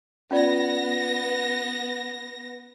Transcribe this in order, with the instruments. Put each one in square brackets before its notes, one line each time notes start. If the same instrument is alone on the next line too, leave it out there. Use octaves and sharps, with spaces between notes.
[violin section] B3 A#6 [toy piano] C#4 F4 D5